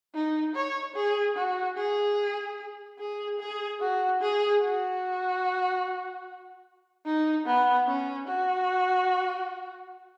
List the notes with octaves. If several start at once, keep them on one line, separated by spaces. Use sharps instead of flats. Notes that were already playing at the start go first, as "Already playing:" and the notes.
D#4
C#5
G#4
F#4
G#4
G#4
G#4
F#4
G#4
F#4
D#4
B3
C#4
F#4